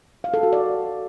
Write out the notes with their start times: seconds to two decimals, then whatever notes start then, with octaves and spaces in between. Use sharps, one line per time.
0.24 F5
0.34 A4
0.43 F#4
0.53 D5